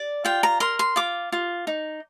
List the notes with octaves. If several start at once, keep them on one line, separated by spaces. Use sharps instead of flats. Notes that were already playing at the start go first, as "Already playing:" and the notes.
Already playing: D5
F4 G5
A#5
A#4 C6
C6
F4 D6
F4
D#4